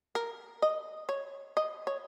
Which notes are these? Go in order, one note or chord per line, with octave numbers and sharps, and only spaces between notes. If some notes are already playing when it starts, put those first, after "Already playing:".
A#4
D#5
C#5
D#5
C#5